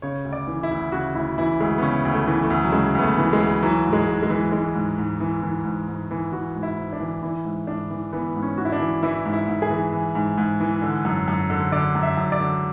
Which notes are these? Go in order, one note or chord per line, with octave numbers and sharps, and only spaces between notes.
C#3 C#5
D2
D5
E3
E4
D2
C#3 F#4
D2 E4
E3 E4
D2 G#3
B3
C#3 C#4
D2
A3
E3
A3
D2
F#3
C#3 G#3
D2 B3
A3
E3
G#3
D2
E3 F#3
G#2
G#3
G#2
G#3
E3
E3 G#3
G#2
G#2
E3
E3
G#2
G#2
E3
E3 F#4
G#2
E4
G#2
D4
E3
E3 E4
G#2
G#2 D4
E3
E3 B3
G#2
C#4
G#2 F#4
E4
D4
E3
E3 E4
G#2
E4
G#2
G#4
E3
E3
G#2
G#2
E3
D3
F#2
F#2
D3
D3 D5
F#2
E5
F#2
D5
D3